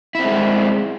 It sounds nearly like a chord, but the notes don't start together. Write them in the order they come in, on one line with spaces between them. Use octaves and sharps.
E4 C4 G#3